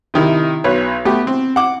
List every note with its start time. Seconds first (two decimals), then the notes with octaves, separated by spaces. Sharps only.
0.14 C3 D#3 E4
0.64 B1 B4 C#5
1.05 A3 B3 G4
1.27 C4
1.56 F#5 D6